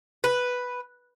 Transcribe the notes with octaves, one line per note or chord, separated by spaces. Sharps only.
B4